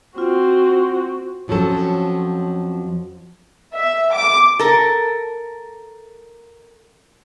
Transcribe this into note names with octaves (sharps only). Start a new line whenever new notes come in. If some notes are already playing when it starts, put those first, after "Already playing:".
C4 F4 F#4
F2 F3 F#3 C#4 A4
E5
D6
A4 A#4